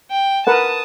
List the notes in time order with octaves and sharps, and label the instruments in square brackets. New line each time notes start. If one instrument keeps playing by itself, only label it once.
[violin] G5
[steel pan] A#4 B4 F#5 [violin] A5 D#6